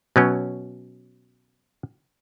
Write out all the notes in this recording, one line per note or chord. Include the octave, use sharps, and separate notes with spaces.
B2 F#3 C#4